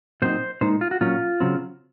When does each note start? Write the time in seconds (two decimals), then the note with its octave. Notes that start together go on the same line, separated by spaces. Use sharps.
0.22 A#2 F#3 C4 D#4 C5
0.61 A#2 G#3 D#4 C5
0.81 F4
0.91 F#4
1.01 A#2 F#3 C#4 F4
1.40 C#3 F#3 C4